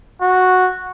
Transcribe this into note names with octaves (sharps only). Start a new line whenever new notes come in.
F#4